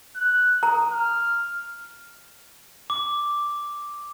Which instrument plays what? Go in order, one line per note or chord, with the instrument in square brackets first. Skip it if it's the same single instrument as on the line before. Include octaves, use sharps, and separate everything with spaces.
[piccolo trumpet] F#6
[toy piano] A#5 [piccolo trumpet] D#6
[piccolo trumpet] F6
[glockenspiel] D6